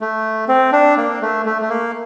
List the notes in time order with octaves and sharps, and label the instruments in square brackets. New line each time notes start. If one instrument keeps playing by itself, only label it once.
[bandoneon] A3
C4
D4
A#3
A3
A3
A3
A#3